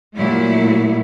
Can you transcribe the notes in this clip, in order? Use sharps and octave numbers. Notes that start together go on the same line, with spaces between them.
A#2 F#3 G3 A3 E4